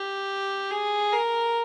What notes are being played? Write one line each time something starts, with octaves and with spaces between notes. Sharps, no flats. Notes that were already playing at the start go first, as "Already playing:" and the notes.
Already playing: G4
G#4
A#4